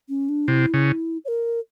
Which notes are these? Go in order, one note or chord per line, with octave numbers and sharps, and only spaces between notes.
C#4
D4
C3 E4
C#3
C#5
A#4